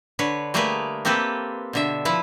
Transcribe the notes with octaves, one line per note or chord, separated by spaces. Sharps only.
D3 B4 C#5
G3 A3 A#3 G#4 A#4 B4
A#3 C4 G4 A4 B4
B2 D3 E5
F3 E4 B4